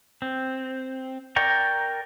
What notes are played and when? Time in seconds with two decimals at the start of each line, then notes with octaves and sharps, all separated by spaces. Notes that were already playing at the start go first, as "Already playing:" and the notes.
0.22 C4
1.36 A#4 D5 G5 A#5 C#6